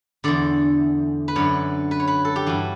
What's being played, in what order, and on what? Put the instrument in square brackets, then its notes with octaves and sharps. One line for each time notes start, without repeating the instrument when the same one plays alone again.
[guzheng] E2 D3 D5
B4
F#2 D3 C#5
B4
C#5
B4
A4
G4
G2 E3 F#4